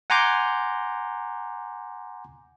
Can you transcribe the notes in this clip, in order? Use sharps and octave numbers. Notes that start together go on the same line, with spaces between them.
F#5 G#5 A#5 C6 D6 G6